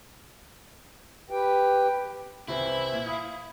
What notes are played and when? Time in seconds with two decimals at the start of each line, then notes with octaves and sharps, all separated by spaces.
1.30 G4 B4 G5
2.48 C2 E3 C4 E4
2.92 A#2
3.07 F5 B5 D#6